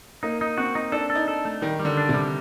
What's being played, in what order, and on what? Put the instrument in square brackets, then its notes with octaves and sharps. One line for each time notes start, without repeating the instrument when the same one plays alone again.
[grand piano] A#3 [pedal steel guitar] D#4
[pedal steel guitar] D#4
[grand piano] C4 [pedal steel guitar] F#4
[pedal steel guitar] D#4
[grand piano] D4 [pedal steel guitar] A4
[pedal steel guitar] A4
[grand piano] D#4
[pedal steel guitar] A4
A3
[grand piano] D#3 [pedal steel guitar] G3
[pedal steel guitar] G3
[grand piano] D3
[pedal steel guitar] D4
[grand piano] C3
[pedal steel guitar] G3